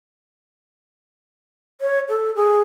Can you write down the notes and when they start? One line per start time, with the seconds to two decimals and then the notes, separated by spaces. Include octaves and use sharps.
1.81 C#5
2.09 A4
2.35 G#4